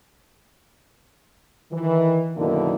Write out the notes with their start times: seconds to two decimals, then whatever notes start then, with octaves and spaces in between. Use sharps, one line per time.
1.71 D#3 E3
2.36 F#2 B2 D3 D#3 A#3 E4